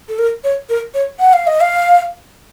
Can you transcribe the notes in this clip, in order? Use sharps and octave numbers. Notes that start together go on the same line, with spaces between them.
A4
A#4
C#5
A#4
C#5
F#5
F5
D#5
F5